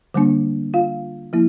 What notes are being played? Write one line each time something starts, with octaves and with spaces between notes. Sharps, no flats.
D3 G3 A#3 D4
F4 F5
F3 A#3 E4